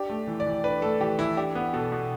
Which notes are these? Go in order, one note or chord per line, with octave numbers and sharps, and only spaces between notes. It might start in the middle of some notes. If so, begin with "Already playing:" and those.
Already playing: D4 G4
A3
E3
D5
E3
D4 B4
A3 A4
E3 G4
E3 E4
D4 G4
B3
B2 A4
B2